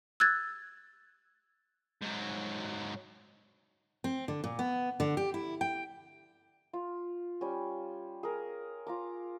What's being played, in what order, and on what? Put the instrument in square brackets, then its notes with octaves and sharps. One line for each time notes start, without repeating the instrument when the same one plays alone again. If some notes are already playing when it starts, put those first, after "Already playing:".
[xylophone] E6 F#6 G#6 A6
[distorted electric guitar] G#2 F#3
[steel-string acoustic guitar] C4
D3
A#2
B3
D3
G4
E4
G5
[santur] F4
G3 C#4
G#4 A#4
F4 A#5 D6